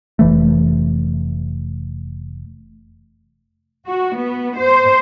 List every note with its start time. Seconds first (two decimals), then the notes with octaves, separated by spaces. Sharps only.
0.19 F1 E3 A3
3.88 F#4
4.19 B3
4.58 C5